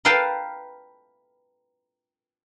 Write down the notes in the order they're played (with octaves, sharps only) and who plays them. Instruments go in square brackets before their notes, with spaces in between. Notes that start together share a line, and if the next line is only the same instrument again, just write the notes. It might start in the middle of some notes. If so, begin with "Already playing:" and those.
[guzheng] A#4 B4 F5 G5 A5